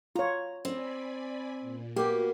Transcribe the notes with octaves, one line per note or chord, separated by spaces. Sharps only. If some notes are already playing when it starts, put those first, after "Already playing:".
F4 C#5 A#5
C4 D5 G#5 B5
A#2
A#3 B3 F#4 G4